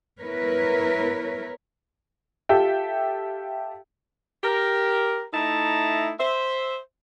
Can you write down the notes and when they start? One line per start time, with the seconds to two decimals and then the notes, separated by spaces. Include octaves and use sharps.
0.21 B3 E4 A#4 B4 C#5
2.49 F4 G4 A4 E5 G5
4.44 G4 A#4
5.33 A3 D#4 E4 A5 A#5
6.19 C5 E5